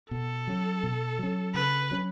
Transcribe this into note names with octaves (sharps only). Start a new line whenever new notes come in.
B2 A4
F#3 C#4
B2
F#3 C#4
C#3 B4
F#3 C#4